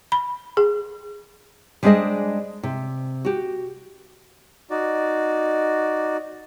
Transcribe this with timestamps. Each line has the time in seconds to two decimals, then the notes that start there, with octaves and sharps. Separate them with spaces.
0.12 B5
0.57 G#4
1.83 G3 G#3 D4 G#4 C5 D#5
2.63 C3
3.25 F#4 G4
4.70 D#4 F#4 D5